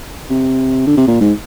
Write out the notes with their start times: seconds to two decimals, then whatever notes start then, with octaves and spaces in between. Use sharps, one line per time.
0.30 C3
0.87 D3
0.97 C3
1.08 A#2
1.21 G#2